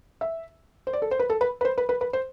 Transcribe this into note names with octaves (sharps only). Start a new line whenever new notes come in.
E5
C5
D5
A4
C5
B4
A4
B4
B4
C5
B4
B4
B4
C5